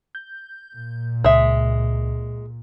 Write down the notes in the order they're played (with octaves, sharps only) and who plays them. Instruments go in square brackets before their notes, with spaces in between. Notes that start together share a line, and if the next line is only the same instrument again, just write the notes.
[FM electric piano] G6
[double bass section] A#2
[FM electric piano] C#2 [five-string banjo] G#3 E5